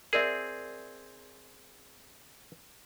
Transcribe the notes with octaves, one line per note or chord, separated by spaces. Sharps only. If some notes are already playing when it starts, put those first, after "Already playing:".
C4 G#4 A#4 D5 E5